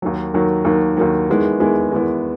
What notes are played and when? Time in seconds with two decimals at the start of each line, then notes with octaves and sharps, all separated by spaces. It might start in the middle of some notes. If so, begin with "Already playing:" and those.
0.02 D#2 D#3 F#3
0.34 D#2 D#3 F#3
0.65 D#2 D#3 F#3
0.97 D#2 D#3 F#3
1.29 E2 D#3 G#3 B3 E4
1.60 E2 D#3 G#3 B3 E4
1.91 E2 D#3 G#3 B3 E4